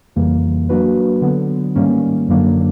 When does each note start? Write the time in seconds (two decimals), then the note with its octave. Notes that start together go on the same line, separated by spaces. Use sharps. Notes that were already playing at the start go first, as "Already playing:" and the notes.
0.16 F2 C#3 E3 G3 A#3
0.69 F#3 A#3 D4 F#4 B4
1.22 D3 F#3 B3
1.75 G#2 D#3 G3 A#3 C#4
2.28 F#2 D3 F#3 A#3 D4